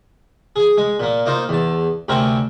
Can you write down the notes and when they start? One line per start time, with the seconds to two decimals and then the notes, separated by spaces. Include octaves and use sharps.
0.56 G#4 G#5
0.77 G#3
1.00 A#2 A#3
1.26 A#3 D#4 F4 C5
1.49 E2 A5
2.08 D2 C3 C4 A#4 G#5